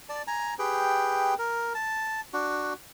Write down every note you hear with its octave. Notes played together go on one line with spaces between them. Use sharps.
D5 A5
G#5 A#5
G4 G#4 B4 G5
A#4
A5
D4 F#4